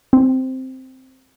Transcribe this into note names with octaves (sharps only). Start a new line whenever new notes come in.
C4